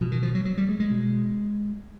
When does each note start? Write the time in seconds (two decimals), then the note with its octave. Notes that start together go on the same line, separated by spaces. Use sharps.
0.01 B2 F3
0.12 D#3
0.23 F3
0.35 F#3
0.45 F#3
0.57 G3
0.69 G#3
0.80 G#3
0.90 B2